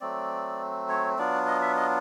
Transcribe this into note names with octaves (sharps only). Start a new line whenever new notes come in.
F#3 A3 C4 D5
C#5
F#3 B3 D4 F4 D5
D#5
E5
D#5